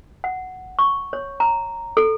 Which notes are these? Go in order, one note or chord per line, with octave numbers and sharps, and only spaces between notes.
F#5
C#6
C#5
A#5
A4